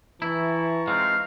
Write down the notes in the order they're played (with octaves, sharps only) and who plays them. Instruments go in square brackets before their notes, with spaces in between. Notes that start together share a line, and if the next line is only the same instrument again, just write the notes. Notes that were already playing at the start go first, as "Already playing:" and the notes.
[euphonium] E3 [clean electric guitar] E4 [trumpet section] A5 A#5 C#6
[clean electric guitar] G#3 C4 D#4 [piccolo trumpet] F5